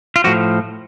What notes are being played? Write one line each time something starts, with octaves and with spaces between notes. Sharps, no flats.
F4
A2 F3 F#4